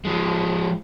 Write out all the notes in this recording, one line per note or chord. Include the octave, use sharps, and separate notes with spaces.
F3 G#3